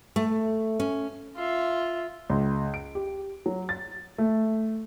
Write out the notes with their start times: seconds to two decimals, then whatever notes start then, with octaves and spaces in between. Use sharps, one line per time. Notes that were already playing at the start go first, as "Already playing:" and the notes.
0.16 A3
0.80 C#4
1.36 F4 E5
2.30 C#2
2.74 D7
2.95 G4
3.46 F#3
3.69 A6
4.18 A3